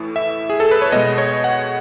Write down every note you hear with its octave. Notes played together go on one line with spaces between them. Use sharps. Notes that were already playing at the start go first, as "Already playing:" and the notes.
Already playing: A2 E3 A3
E5
G#4
A4
B4
C#5
B2 G#3 D#5
C#5
F#5